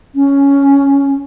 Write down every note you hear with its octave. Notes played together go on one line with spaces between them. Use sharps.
C#4